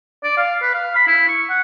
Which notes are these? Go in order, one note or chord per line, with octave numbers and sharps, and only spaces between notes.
D5
F5
B4
F5
B5
E4
C#6
F#5